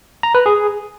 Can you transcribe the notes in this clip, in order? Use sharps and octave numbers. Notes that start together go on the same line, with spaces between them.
A#5
B4
G#4